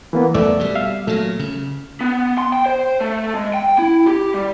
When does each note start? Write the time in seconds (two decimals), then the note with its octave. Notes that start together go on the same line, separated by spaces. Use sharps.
0.13 E3 A#3 B3
0.34 E2 A3 D5 E6
0.59 B2 G3
0.75 E5 F5
1.07 A#2 F#3 A3
1.39 C#3
2.01 B3
2.38 C6
2.52 G5
2.66 C5
3.00 A3
3.35 G#3
3.54 G5
3.79 E4
4.07 G4
4.34 G3